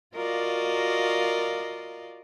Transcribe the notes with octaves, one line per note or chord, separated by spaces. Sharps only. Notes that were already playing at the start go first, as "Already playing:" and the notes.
F4 F#4 A#4 D5 D#5 F5